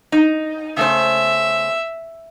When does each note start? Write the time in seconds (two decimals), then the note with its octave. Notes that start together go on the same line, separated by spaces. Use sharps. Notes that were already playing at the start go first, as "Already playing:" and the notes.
0.12 D#4
0.77 C#3 A3 C5 E5